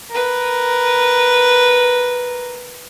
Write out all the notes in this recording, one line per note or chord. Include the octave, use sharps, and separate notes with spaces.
A#4 B4